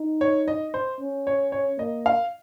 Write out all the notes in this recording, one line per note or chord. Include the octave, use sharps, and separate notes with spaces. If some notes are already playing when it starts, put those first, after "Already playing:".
Already playing: D#4
C#5
D#5
C5
C#4
C#5
C#5
A#3 D#5
F5